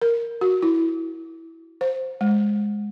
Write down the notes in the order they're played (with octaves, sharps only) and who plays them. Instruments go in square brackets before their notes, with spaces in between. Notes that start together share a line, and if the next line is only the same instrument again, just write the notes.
[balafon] A#4
F#4
E4
C5
G#3